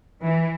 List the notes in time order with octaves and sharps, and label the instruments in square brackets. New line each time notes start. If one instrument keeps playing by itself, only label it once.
[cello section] E3